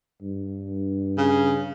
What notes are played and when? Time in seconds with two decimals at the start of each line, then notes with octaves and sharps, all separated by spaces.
0.22 G2
1.17 C#3